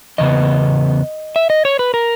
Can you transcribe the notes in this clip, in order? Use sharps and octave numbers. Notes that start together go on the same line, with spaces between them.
E2 C#3 B3 D#5
E5
D#5
C#5
B4
A#4